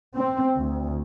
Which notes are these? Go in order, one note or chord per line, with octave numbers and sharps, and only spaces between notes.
C4
D2